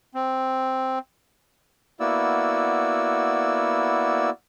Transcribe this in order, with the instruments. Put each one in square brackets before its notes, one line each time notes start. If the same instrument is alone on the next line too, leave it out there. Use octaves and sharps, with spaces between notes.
[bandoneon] C4
[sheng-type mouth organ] A#3 B3 E4 F#4 D5 E6